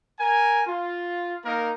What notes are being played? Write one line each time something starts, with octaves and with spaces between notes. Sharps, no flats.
A#4 G#5
F4
A#3 D#4 A#4